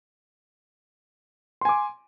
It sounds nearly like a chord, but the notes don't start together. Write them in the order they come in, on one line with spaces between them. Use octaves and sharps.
C6 G#5 D6